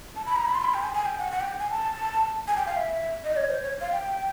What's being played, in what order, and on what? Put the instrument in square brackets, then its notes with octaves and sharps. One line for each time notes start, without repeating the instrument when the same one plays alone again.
[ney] A5
B5
A#5
B5
C6
B5
G5
G#5
G#5
G5
F#5
F#5
G5
G#5
A5
G#5
G5
F5
E5
D#5
C#5
C5
C#5
F5
G5